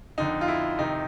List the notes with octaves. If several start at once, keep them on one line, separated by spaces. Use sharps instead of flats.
F2 D3 D#4
F4
E4
F2 C3 D#3 D#4